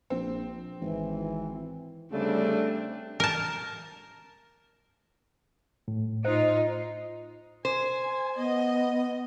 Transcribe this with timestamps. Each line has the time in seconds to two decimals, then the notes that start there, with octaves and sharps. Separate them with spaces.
0.10 A#1 C4
0.81 G#1 E3
2.12 D2 C#3 G3 A3 C4 D4
3.20 A#4 A5
5.88 A2
6.25 D#4 F4 C5 D#5
7.65 C5 G#5
8.37 B3 D#5